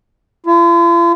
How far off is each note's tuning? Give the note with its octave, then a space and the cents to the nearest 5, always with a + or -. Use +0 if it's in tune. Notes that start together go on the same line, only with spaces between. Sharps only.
F4 -45